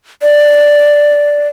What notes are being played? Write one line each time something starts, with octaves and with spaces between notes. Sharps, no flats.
D5